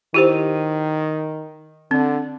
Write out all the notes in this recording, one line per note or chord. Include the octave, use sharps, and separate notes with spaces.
D#3 E4 G4 C5
D3 C4